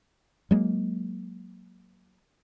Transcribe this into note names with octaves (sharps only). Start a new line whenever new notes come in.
F#3 G#3 A#3